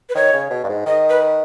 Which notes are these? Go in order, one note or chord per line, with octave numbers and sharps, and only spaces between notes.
B4
D#3 C#5
C#3
B2
G2
G#2
D#3 D#5
B4